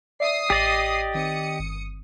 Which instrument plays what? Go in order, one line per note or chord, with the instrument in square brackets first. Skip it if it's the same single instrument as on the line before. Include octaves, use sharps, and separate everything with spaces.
[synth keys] D5 E5 [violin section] D#6 C7
[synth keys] A1 A#6 [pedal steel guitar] G4 D5 D#5
[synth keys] D#3 C4 [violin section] D#6 C#7
[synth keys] G1